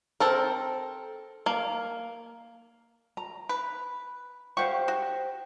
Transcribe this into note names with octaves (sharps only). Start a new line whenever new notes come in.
C4 A4 A#4
A#3
A#5
B4
G4 C5 F5 F#5 C#6
F#4